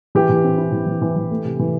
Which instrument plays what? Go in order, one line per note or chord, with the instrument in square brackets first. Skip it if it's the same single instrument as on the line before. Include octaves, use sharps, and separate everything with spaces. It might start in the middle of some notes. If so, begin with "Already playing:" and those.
[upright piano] E3 G4
E3
C4
E4
E3
E3
E3
E3
A3
C3
E3